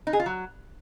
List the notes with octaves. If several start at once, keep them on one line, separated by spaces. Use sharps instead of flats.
D#4
G#4
F4
F#3